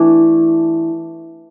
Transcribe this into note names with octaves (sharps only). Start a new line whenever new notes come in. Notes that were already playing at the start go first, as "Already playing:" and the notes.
Already playing: E3 A3 D4